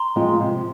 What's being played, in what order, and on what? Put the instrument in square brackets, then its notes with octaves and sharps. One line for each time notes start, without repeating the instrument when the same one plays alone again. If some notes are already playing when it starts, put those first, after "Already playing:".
Already playing: [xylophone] A#5 C6
[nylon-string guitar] F3 G#3 C4 F4
C3